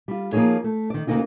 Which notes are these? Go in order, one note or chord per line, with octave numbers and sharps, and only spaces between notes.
G3 F4
F3 A#3 C4 D#4 G#4 C#5
A3
D#3 D5
D2 A#2 C#3 A#3 D#4 F4